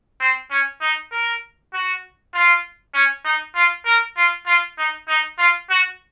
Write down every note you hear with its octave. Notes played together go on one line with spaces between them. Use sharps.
C4
C#4
D#4
A#4
F#4
F4
C#4
D#4
F4
A#4
F4
F4
D#4
D#4
F4
F#4